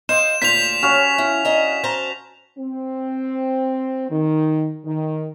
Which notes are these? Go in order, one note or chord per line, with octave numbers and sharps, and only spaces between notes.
C5 D#5 F5 E7
D2 A#2 F4 C5 B6 F7
C#4 F#4 F5
E4
D4 D#5 A#5
C5 A5 A#5
C4
D#3
D#3